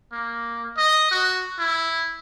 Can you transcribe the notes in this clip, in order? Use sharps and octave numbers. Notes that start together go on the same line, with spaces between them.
A#3
D#5
F#4
E4